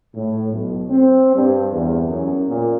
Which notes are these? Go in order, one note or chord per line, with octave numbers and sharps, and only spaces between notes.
A2
B1
C4
G2
E2
F#2
A#2